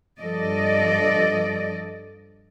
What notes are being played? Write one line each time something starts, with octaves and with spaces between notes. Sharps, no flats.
G2 F3 A4 D5 D#5